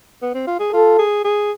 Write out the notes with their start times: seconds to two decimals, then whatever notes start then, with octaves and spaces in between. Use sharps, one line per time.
0.22 B3
0.34 C4
0.47 F4
0.60 G#4
0.73 F4 A4
0.99 G#4
1.25 G#4